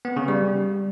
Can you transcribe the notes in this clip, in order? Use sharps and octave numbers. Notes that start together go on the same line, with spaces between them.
B3
C#3
G3